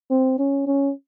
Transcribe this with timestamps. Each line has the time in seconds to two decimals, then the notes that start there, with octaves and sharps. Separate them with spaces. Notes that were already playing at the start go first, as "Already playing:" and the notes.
0.11 C4
0.39 C#4
0.67 C#4